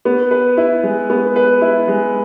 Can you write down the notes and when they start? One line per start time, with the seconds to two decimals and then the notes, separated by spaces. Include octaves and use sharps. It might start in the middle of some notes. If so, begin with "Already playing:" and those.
0.05 B3
0.31 B4
0.57 E4
0.83 G#3
1.10 B3
1.36 B4
1.62 E4
1.88 G#3